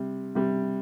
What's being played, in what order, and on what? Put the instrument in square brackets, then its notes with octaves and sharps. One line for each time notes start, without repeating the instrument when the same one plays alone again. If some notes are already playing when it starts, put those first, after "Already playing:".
Already playing: [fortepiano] C3 G3
C3 G3